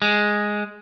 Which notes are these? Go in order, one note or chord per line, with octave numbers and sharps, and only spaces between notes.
G#3